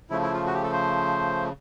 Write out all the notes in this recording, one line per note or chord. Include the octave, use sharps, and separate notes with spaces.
C#3 F3 A3 E4
E4
F4
F#4
G4
A4
C5